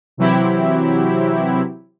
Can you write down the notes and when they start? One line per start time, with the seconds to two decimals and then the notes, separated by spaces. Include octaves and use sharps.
0.17 C3 E3 F#3 C4 E4 G4